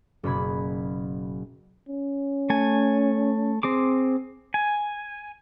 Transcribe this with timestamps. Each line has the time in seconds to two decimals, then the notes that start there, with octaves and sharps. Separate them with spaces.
0.23 F#1 B2 B5 G#6
1.89 C#4
2.50 A3 G#5
3.63 C4 G#4 D6
4.54 G#5